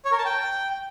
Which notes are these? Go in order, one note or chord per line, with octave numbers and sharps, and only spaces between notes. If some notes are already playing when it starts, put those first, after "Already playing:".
C#5
A#4
A5
G5